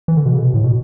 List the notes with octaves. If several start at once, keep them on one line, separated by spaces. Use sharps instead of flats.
E3
D3
B2
C#3
B2
A2
B2